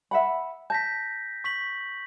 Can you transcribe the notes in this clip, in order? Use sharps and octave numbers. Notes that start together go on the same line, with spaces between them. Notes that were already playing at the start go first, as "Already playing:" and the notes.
E5 F#5 B5
A5 G6 A#6 B6
C#6 B6 F#7